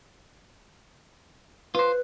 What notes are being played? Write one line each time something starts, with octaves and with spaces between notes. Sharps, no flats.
F4 B4 C5